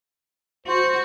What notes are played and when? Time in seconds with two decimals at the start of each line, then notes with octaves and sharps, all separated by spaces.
0.67 F#4 C5